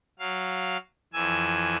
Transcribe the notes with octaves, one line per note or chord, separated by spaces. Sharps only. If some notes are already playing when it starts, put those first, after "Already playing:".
F#3 F5
F2 E3 G#5 E6